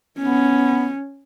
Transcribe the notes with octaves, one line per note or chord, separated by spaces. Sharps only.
B3 C#4